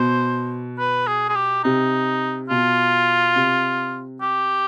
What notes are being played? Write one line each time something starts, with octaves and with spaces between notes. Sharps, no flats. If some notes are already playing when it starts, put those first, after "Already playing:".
Already playing: B2 C5
B4
G#4
G#4
G4
C3 D#4
B2 F4
C3
G4